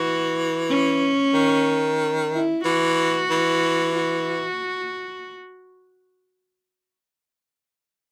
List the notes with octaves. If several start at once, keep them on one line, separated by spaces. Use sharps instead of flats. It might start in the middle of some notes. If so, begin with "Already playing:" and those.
Already playing: E3 F#4
C#4
D#3
E4
E3 F#4
E3
F#4